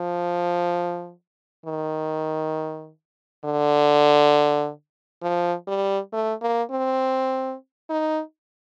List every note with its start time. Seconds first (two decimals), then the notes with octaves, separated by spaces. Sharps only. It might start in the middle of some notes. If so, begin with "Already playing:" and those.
Already playing: F3
1.66 D#3
3.45 D3
5.22 F3
5.68 G3
6.13 A3
6.42 A#3
6.71 C4
7.90 D#4